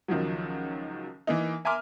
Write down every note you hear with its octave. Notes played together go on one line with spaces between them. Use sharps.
C#2 D#3 F3 F#3
E3 A#3 D#4
E5 G#5 A#5 C6 D6 F6